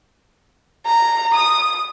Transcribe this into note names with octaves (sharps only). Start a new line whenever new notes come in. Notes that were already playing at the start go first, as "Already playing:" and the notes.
A#5
D#6